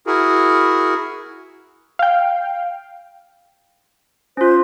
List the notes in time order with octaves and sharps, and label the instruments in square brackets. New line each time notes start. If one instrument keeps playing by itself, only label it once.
[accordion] E4 F#4 G#4 A#4
[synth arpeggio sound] F5 G5
[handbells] C#4 F4 [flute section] C5